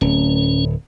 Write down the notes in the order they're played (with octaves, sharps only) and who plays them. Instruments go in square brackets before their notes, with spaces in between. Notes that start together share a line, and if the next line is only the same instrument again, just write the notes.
[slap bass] D1 [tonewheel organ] C#4